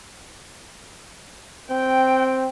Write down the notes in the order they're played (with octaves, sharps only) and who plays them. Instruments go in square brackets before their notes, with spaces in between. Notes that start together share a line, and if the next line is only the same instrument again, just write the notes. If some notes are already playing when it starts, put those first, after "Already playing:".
[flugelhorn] C4 [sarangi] G5